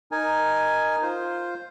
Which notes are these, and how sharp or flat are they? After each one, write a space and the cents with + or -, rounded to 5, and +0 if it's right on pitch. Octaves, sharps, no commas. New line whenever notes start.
D#4 +0 A#4 +0 G#5 +0
F4 +0 C5 +0